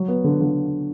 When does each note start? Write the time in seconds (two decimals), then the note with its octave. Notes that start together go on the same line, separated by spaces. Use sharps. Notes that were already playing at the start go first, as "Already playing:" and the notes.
Already playing: F#3
0.08 B3
0.24 D3
0.40 D3